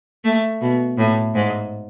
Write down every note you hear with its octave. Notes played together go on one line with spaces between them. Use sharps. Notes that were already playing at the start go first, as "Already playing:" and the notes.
A3
B2
A2
G#2